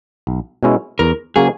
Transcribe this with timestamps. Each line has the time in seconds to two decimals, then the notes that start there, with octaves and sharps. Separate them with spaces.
0.27 B1
0.63 B2 G#3 C#4 E4
0.99 E2 A#4
1.36 C#3 F#3 A#3 C#4 G#4